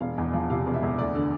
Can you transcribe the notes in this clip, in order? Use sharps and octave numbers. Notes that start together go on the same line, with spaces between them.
E1 F5
E2
F3
C3 F5
E1
E5
E2
D2 D5
D3